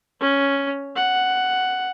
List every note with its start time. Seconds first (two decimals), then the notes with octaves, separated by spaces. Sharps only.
0.21 C#4
0.96 F#5